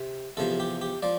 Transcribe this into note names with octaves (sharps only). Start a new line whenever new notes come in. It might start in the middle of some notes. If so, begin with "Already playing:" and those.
Already playing: C3
E2 C3 F3 A4
G4
G4
F3 D5